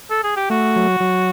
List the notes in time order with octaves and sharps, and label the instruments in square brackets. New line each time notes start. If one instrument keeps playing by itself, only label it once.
[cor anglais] A4
G#4
G4
[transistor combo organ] A3 [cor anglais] F#4
[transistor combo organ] F#3
F#3